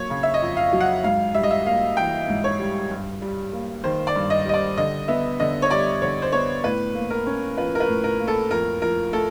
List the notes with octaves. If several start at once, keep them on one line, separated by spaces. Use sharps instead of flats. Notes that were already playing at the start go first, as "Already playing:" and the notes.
Already playing: F#3 A#3 C#5
C#3
E5
D#5
F2
F5
F#3
F#5
G#2 F5
G3 E5
D#5
E5
A#3 F5
E3 G5
G#2
C#5
G3
G2
G3
A#3
D#3 C5
D5
G2
D#5
G3 D#5
D5
D3 D#5
B3 E5
D3 D#5
C#5
G3 D5
D3 C#5
C5
B3 C#5
A2 B4
A#3
A#4
C#4
F3 B4
A#4
B4
A2
A#4
A#3
A4
F2 A#4
F3 A#4
A3 A4